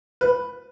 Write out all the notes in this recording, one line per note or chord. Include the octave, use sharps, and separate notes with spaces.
B4